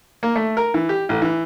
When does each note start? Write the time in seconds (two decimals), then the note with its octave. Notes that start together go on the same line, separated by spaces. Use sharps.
0.23 A#3
0.36 A3
0.57 A#4
0.74 E3
0.89 G4
1.09 A1
1.22 E3